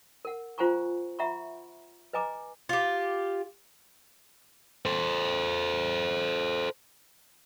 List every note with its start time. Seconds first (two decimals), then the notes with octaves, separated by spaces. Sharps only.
0.25 A#4 F#5
0.58 F4 C5 F#5 G#5 A#5 C#6
1.19 E5 F#5 A#5 B5 C#6
2.13 B4 D#5 G#5 A#5 D6
2.69 F4 G4
4.85 A4 C5